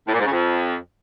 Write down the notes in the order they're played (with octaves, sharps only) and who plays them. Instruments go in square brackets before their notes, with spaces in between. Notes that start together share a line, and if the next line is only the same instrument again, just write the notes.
[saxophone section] A2
A#2
G#2
C#3
F2